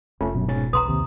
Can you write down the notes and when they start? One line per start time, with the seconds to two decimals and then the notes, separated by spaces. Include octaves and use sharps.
0.21 F1 A3 C#4 F4
0.35 F#2 B2
0.48 G#2 C#4 A6
0.73 B1 E2 B4 A#5 C6 D#6
0.88 D#2 C3